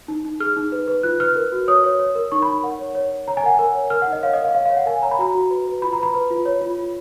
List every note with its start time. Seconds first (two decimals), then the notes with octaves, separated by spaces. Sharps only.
0.08 D#4
0.25 D#4
0.40 G#4 F6
0.57 D#4
0.72 B4
0.88 B4
1.03 F4 F#6
1.20 B4 F6
1.36 A#4
1.52 F#4
1.68 C#5 D#6
1.84 C#5
1.99 C#5
2.15 A#4
2.32 D#4 C#6
2.42 D#4 B5
2.63 A#4 F#5
2.79 C#5
2.95 C#5
3.12 C#5
3.28 C#5 A#5
3.37 G#5
3.43 A#4 F#5
3.54 A#4 G#5
3.75 C#5
3.90 A#4 F6
4.02 F#5
4.07 D#4
4.12 D#5
4.23 C#5 F5
4.33 D#5
4.39 A#4
4.44 F5
4.54 C#5 F5
4.65 F5
4.70 C#5
4.77 F#5
4.86 A#4 G#5
5.03 C#5 A#5
5.11 B5
5.19 F#4 A#5
5.35 F#4
5.51 B4
5.67 B4
5.82 F4 B5
5.93 A#5
5.98 B4 B5
6.14 B4
6.30 F4
6.45 C#5
6.61 F4
6.78 F4